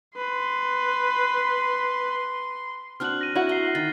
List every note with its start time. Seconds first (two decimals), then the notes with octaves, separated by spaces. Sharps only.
0.18 B4 C6
3.00 C4 D4 F#4 F6 F#6 F#7
3.21 A#6 D#7
3.35 E4 F#4 F#5
3.49 A#5 C7 G7
3.75 D#3 A6